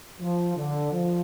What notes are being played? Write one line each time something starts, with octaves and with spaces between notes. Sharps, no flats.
F3
D3
F3